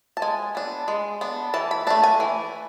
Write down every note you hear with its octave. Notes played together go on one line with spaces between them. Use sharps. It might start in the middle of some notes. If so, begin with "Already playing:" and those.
A5
G#3 G#5
B3 D4
G#3
B3 D4
E3 A5
B5
A3 D4 A5
G#5
E3